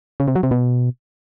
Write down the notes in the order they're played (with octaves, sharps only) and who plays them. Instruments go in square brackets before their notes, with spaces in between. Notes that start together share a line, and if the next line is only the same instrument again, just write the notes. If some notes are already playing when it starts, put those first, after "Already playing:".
[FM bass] C#3
C3
F#3
C3
B2